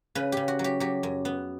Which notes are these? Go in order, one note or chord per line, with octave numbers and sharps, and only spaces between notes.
C#3 B4
C#3 G4
F#4
F#3
G4
F#3 G4
F#2
B3